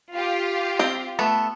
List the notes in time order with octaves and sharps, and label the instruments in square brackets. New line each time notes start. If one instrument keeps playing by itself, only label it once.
[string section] F4 G4
[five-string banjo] C4 G5
A3 B3 A4